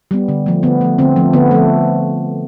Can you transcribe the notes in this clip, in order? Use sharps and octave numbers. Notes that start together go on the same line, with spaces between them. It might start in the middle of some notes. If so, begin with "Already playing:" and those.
G3 B3
D3
F3 A3
D3 B3
F3 A3
D3 C4
F3 A3
D3 B3
F3 A3